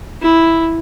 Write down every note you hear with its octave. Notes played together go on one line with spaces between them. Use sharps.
E4